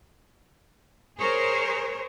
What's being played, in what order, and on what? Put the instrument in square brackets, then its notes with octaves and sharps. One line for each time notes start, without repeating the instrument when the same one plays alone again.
[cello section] G#4 A#4 C5 C#5